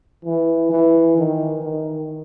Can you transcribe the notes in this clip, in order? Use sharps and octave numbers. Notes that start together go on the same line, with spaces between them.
E3
E3
D#3
D#3